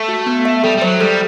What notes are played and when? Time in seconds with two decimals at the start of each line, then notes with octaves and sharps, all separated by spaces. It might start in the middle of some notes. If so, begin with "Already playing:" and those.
Already playing: A3
0.08 F#4
0.26 B3
0.45 E5
0.64 G3 A4
0.77 G3
0.82 F#3 C5
1.00 G3 A4